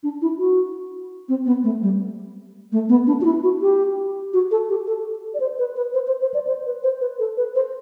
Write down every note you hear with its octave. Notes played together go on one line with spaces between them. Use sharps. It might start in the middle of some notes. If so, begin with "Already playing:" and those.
D4
E4
F#4
C4
B3
A3
G3
A3
B3
D4
F#4
E4
F#4
G4
F#4
A4
G4
A4
D5
C5
B4
B4
C5
C5
C5
D5
C5
B4
C5
B4
A4
B4
C5